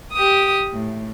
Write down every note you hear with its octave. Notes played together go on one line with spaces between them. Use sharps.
G4 D#6
A2